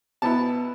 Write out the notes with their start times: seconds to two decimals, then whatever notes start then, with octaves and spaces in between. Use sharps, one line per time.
0.22 B2 B3 E4 A5